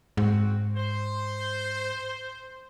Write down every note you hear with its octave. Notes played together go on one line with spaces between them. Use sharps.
G#2 C4 F#4
C5